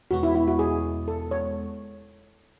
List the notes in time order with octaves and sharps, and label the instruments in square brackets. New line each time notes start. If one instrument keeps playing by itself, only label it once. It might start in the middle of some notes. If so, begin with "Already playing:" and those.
[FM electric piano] E2 B2 G#3 B3 [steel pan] F#4
[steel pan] E4
E4
F#4
G#4
A4
C#5